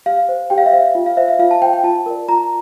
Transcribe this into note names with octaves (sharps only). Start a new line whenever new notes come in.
G4 F5
C5
G4 G5
F5
E5
C5 F5
F4
F5
C5 E5
F5
F4 F5
A5
C5 G5
G5
F4 A5
A#4 D5
F4 A#5